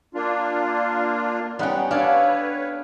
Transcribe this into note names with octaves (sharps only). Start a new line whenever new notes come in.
A#3 D4 F4
G3 B3 C#4 D#4 F#5 G5
D4 A4 B4 C#5 F5 C#6